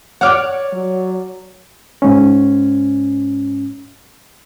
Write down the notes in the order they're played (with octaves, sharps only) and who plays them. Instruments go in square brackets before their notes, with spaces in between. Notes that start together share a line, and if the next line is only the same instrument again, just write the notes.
[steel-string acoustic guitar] C#5 D5 [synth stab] F#5 D6 F6
[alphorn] F#3
[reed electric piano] G#2 C#4